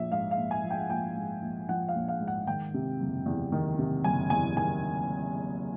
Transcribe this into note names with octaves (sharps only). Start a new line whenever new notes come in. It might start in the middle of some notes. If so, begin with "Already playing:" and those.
Already playing: A#1 F3 E5
G#2 F5
F5
A#1
G#5
F3
G5
F#5
A#1 G5
G#2
A#1
F3 F#5
F5
A#1
F5
G#2
F#5
D#3 G5
C3
F#1
E2
D#3
C3
F#1 G#5
E2 G#5
D#3 G#5